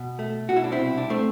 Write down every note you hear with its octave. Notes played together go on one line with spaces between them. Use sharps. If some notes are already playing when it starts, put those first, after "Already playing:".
Already playing: B2
A3
B2 F#4
E4
D4
C4 E4
C2
D4
A3 C4